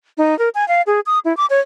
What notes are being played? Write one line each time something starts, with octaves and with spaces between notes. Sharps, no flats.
D#4
A#4
G#5
F5
G#4
D#6
E4
D6
C#5